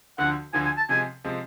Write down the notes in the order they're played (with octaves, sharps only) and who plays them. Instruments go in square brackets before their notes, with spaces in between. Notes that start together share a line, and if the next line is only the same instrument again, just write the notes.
[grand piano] D2 D3 F3 [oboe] F#5
[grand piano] D2 D3 F3 [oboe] G#5
[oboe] G#5
A5
[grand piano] C3 F3 G#3 [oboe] G#5
[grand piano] C3 F3 G#3